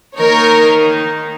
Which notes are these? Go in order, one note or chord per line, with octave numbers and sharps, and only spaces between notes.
D#3 A#3 D#4 A#4 C#5